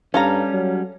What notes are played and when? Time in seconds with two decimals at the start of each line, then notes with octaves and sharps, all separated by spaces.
0.14 G2 G3 C#4 A4 F5 A#5
0.52 F#3